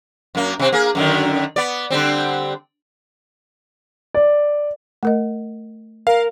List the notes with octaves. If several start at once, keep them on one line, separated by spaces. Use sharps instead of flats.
F#2 A#3
C3 C4
A#3 G#4
F#2 D3 D#3
B3 D5
D3 G3 C4
D5
A3 A#4 D#5
A#4 F5